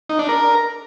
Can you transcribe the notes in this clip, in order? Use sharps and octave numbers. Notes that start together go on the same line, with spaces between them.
D#4
D4
A#4